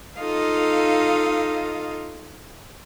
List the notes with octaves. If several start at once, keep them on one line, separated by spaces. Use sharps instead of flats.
D#4 F4 A4 D#5 F5